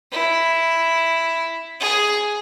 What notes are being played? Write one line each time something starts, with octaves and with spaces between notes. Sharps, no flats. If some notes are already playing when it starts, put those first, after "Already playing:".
E4
G#4